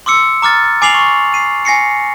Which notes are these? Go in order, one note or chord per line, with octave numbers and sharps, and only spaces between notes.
C6 D6 E6 C#7
A#5 D6 F6 A6
G#5 D6 C7 F7 F#7
C#6
C7 D#7
G#5 A#6 C7 C#7